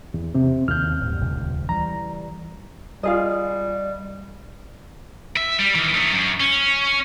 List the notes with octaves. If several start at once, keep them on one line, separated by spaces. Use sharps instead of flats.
E2
C3 C4
D#2 C#3 F6 G6
D1 G2
D#1 C#2
E3 G3 A#5
G3 F4 G#4 D#5
E5
G3
D#3 E3
A3 D#4
F#2
C#4